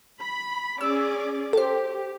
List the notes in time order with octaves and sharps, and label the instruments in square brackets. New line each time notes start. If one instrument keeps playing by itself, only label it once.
[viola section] B5
[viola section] C#4 G#4 D5 [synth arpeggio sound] E6
[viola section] G4 [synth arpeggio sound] A4 C5